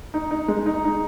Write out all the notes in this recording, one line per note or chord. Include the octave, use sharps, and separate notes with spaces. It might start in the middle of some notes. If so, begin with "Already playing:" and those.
D#4
D#4
G#3
D#4
D#4